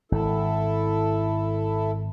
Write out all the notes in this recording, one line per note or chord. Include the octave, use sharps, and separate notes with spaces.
G#1 E4 A4